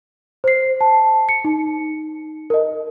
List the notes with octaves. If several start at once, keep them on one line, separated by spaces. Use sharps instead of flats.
C5 C7
A5
C#7
D#4
A#4 D#5